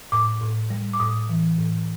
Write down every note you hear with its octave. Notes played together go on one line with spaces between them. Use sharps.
A2 D6
A2
G3
D6
A2 D#6
E3
A2